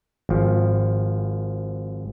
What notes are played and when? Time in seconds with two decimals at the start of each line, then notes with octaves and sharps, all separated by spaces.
0.29 G#1 F3